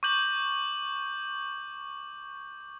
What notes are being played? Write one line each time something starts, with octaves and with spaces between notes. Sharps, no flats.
C#6 D6 G6 F#7